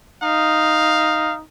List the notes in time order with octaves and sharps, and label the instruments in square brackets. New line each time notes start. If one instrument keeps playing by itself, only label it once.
[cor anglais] D#4 [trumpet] F5